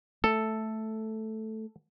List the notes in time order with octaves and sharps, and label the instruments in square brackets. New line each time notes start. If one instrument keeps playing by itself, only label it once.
[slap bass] A3 [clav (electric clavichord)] A4